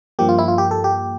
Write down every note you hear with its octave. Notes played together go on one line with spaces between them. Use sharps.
G2 F3 A#3 G4
F4
E4
F4
G4
A4
G4